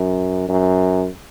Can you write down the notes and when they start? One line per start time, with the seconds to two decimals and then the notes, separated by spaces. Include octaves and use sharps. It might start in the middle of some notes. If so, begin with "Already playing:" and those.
Already playing: F#2
0.48 F#2